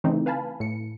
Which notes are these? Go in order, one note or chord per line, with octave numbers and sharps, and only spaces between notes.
C#3 E3 A3 C4 D#4
B4 F5 G#5 A5 B5
A2 C#7